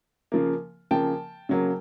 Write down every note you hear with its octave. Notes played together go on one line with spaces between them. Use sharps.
C#3 F3 A#3
C#3 F3 A#3 G5 A5
C#3 F#3 A#3